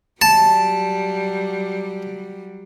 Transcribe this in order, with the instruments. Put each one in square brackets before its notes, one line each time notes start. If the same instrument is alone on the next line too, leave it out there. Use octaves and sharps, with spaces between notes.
[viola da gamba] F#3 G3 [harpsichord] A5